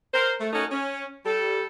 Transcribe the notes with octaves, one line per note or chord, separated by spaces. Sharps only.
A#4 C5
A3
A3 C#4 D#4 F#4 A4 A#4
C#4
G3 A4